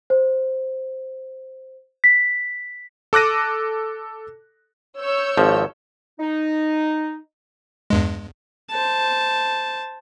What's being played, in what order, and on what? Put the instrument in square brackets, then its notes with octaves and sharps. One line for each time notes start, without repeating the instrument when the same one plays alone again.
[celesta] C5
B6
[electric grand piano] A4 D6 F#6 A#6 D#7
[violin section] C#5 E6 G6
[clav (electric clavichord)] G#1 F3
[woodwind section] D#4
[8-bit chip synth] E2 G2 G#3
[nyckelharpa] C5 A5